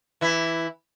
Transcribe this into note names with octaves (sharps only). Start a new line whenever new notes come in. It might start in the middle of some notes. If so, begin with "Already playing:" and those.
E3 E4